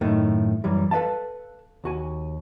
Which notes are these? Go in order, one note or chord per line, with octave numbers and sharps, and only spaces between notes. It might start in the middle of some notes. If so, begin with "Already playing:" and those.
F#2 A2 D#3 A3
F#2 E3 G3
A4 B4 D#5 F5 A5
D#2 F#4 G#5